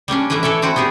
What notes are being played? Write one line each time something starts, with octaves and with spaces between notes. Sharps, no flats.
G3 A#3 C#4 D4
E3 A3 A#3 E4 B4
E3 A4 C#5 D5 E5
D3 C4 E4 F#4 B4
B3 D#4 G4 G#4